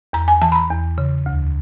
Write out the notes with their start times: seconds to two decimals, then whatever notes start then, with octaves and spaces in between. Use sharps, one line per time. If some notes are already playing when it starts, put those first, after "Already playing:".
0.13 E2 A#5
0.28 G#5
0.42 E3 A5
0.52 B5
0.55 A#5
0.70 E2
0.98 C#3
1.26 D2